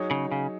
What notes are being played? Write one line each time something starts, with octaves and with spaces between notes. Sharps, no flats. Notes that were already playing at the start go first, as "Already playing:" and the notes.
Already playing: F#3 D#4 G#4 C#5
C#3
C#3